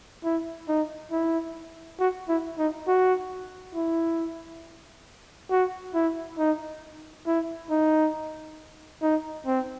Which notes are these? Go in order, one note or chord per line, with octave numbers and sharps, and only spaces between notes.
E4
D#4
E4
F#4
E4
D#4
F#4
E4
F#4
E4
D#4
E4
D#4
D#4
C4